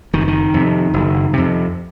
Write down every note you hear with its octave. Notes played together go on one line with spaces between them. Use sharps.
F#1 D#3
E3
D#3
F2 C3
F#1
F2 C3